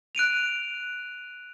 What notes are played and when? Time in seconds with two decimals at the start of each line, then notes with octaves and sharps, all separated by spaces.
0.15 F#6 D7 D#7 F7